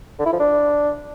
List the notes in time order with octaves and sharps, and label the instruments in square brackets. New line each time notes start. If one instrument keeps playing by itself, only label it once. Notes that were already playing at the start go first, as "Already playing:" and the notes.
[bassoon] D3
E4
F3
D4